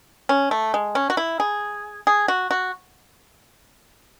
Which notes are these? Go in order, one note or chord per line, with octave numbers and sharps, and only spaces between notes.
C#4
A3
G#3
C#4
F#4
E4
G#4
G#4
F#4
F#4